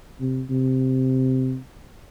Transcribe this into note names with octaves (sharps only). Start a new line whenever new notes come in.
C3
C3